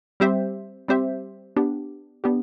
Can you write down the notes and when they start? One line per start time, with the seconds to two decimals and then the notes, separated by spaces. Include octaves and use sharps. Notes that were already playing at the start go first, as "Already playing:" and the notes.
0.20 G3 C4 G4 C5 E5
0.88 G3 C4 G4 C5 E5
1.56 B3 D4 G4
2.24 B3 D4 G4